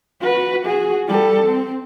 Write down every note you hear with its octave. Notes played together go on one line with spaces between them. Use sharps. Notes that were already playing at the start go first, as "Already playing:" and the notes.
F#4 B4
F#4 G#4
G3 A4
C4